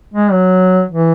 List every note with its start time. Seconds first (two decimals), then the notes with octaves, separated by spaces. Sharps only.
0.14 G#3
0.32 F#3
0.90 E3